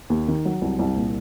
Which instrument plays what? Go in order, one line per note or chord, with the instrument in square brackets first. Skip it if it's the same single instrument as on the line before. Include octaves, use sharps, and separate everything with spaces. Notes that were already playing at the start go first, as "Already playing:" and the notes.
[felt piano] D#2
D#3
F#3
C2
C2
A#2